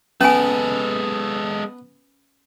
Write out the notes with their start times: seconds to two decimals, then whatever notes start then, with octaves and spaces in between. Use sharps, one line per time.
0.21 G#3 B3 C#4 A4 B4 G#5